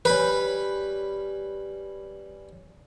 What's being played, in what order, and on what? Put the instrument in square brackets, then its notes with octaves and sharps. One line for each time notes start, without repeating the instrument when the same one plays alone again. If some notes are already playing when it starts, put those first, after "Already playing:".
[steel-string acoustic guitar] G3 C#4 [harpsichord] B4 B5